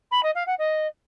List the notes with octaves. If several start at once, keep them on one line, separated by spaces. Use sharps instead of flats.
B5
D#5
F5
F#5
D#5